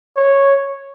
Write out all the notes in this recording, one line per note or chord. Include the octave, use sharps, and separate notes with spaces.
C#5